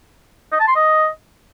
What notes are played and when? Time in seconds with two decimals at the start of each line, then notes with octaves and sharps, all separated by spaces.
0.52 D#5
0.60 A5
0.68 C6
0.76 D#5